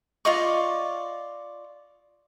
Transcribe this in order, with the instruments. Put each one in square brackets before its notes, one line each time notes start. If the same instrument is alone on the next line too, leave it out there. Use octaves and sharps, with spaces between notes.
[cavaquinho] F4 D5 D#5 C#6